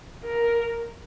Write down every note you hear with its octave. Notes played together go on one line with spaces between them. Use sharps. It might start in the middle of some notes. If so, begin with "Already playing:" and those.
A#4